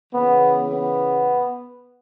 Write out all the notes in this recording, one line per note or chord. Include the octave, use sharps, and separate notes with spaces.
C#3 E3 B3
B3